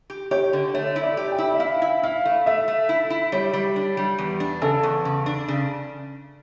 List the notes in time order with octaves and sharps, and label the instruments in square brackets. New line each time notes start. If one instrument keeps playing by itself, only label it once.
[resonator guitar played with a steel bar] G4
[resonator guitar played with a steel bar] G4 [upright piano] C#5
[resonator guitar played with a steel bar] D3
[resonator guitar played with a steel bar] A3 [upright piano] C#5
[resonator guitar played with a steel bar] E4
[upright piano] D5
[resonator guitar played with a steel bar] G4
[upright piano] G5
[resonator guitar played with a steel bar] E4
[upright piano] E5
[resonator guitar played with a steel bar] E4 [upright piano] F5
[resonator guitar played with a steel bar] E4
[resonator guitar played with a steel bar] E4 [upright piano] F5
[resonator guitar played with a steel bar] A3
[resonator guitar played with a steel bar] A3 [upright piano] E5
[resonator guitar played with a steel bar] A3
E4
E4
[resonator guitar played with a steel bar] G3 [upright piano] C#5
[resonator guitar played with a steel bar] G3
D4
G3
E2
D4
[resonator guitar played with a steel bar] C#3 [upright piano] A4
[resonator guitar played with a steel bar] E2
C#3
D4
C#3